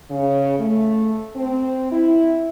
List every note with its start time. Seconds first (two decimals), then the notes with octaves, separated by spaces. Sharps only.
0.11 C#3
0.60 A3
1.36 C4
1.92 E4